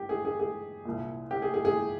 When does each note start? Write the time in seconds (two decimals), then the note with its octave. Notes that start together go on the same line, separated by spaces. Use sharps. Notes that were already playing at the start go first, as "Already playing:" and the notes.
Already playing: G2 G4
0.09 G#4
0.25 G#4
0.39 G#4
0.85 C2 A#2
1.31 G4
1.42 G#4
1.54 G#4
1.65 G#4